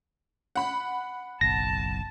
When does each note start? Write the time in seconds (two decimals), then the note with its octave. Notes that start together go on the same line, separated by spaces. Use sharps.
0.56 F#5 B5
1.41 F#1 B1 A5 A#6